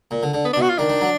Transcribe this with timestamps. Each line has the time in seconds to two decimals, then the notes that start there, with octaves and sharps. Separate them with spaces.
0.11 A#2
0.23 D3
0.34 D3
0.45 B3
0.53 D4
0.56 B2
0.62 F#4
0.69 F4
0.78 D#3 D4
0.89 D#3
1.01 F#3